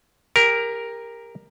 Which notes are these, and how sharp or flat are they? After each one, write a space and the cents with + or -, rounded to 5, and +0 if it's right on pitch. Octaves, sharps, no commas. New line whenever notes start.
G4 +35 A#4 +0